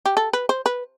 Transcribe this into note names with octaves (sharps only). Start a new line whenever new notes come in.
G4
A4
B4
C5
B4